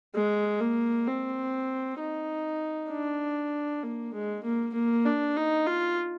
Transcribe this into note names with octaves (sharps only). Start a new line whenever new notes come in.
G#3
A#3
C4
D#4
D4
A#3
G#3
A#3
A#3
D4
D#4
F4